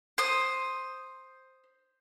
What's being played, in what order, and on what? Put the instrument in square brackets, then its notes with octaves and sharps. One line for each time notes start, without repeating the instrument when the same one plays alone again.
[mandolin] C5 D#6